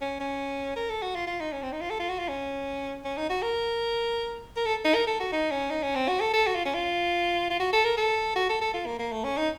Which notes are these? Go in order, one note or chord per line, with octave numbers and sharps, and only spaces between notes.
C#4
C#4
A#4
A4
F#4
F4
F4
D#4
C#4
C4
D#4
F4
A4
F4
F#4
F4
C#4
C#4
D#4
F#4
A#4
A#4
A4
D#4
A#4
A4
F#4
D#4
C#4
D#4
C#4
C4
F#4
A4
A4
F#4
F4
C#4
F4
F4
F#4
A4
A#4
A4
F#4
A4
A4
F4
A#3
A#3
A3
C#4
D#4